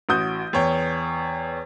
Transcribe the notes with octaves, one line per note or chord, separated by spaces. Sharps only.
A1 F#4 D#6 G6
E2 C#5 G5